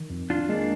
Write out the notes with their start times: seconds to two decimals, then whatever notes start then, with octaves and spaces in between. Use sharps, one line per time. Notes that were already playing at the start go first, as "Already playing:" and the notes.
Already playing: D#3
0.10 F2
0.30 D4 F4
0.49 G#3 A#3 D4